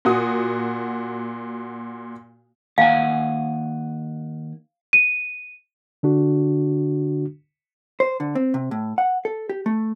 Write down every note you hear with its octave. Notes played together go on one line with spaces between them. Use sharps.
A#2 F#4 D#6
D#2 F5 F#5 G#5
D#7
D3 D4 F#4
C5
D3
C4
C3
A2
F#5
A4
G4
A3